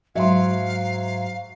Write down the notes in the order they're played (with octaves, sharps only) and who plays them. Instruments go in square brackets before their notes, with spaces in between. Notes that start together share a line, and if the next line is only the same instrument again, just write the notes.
[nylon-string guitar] G#2 F#3 [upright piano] E5 C6 [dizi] F5